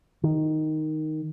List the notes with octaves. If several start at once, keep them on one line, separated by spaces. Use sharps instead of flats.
D#3